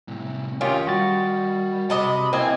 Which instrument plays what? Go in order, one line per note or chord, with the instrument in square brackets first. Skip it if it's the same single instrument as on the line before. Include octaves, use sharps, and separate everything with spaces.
[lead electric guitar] A2 C3
[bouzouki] D#3 [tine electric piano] C#4 F4 G4 [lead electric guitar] F5 G5
[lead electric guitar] G3 [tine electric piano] F#4 A6
[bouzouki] C3 D#5 A5 [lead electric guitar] B5
[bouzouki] A#3 D#5 G#5 [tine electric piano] C4 [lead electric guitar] E4 G4